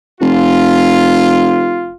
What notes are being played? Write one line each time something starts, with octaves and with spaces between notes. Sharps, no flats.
F1 F4